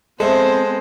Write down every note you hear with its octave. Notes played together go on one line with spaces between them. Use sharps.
G#3 B3 C4 A4 C5 E5